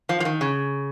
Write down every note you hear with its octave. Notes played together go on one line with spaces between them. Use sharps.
F3
F3
D#3
C#3